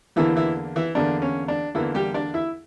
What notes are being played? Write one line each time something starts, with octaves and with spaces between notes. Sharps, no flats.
E2 D3 E3 A#3 E4
E3 E4
E3 E4
E2 D3 A#3 D4
C#4
D4
E2 D3 E3 A#3 E4
G3 G4
D4 D5
E4 E5